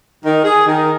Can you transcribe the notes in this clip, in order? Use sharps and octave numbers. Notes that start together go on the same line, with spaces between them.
D#3
G#4
D#3